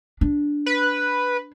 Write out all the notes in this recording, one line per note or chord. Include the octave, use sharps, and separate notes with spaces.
D4
B4